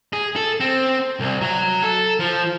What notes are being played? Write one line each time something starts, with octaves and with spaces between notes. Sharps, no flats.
G#4
A4
C4
C2
F#3
A4
F3